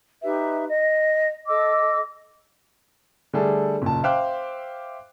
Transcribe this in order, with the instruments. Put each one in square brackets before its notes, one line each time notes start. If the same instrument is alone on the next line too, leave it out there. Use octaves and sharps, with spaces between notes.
[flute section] D#4 G4 B4 E5
D#5
A4 D#5 D6 E6
[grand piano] D3 G3 A3 D4 G#4 A4
F#1 A#2 A5
C5 E5 F5 G5 D6 F#6